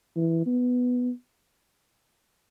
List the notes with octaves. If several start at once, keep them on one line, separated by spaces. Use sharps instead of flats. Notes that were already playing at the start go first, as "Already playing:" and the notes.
E3
B3